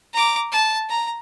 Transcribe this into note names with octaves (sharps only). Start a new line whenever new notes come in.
A#5 D6
A5
A#5